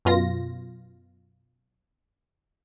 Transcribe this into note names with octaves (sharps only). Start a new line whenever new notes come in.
F#2 B2 F4 A#6